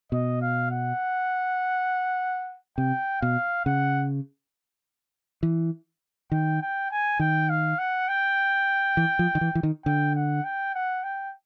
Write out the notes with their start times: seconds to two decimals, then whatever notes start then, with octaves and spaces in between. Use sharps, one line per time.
0.12 B2 D#5
0.41 F5
0.71 F#5
2.77 C3 G5
3.21 B2 F5
3.66 C#3 F#5
5.43 E3
6.32 D#3 G5
6.62 G5
6.91 G#5
7.19 D#3 G5
7.49 F5
7.79 F#5
8.08 G5
8.97 E3
9.19 F3
9.35 D#3
9.41 E3
9.55 E3
9.63 D#3
9.85 D3 G5
10.15 F#5
10.44 G5
10.74 F#5
11.03 G5